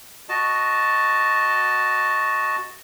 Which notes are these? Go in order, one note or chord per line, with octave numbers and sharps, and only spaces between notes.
F#4 D#5 A5